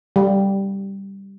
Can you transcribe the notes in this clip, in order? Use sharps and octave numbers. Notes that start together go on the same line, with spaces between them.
G3